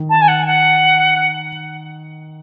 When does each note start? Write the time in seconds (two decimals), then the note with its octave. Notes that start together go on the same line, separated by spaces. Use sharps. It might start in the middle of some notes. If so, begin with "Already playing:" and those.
Already playing: D#3
0.09 A5
0.21 G#5
0.28 F#5
0.46 F#5